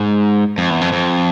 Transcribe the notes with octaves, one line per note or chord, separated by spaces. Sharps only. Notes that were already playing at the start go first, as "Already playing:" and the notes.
Already playing: G#2
F2
E2
F2
F2